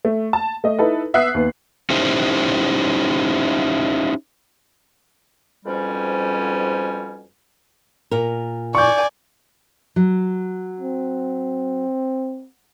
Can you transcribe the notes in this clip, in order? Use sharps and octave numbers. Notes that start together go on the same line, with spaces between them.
A3
A5
A3 D#5
D#4 E4 A4 B4
B3 E5 F#5 D#6 F#6 C7
D#2 B3
C#4 D#4 E4 G4 C5
F2 G#2 B2 G3 C#4
A#2 A#4
D5 G#5 C#6 G6
F#3
C4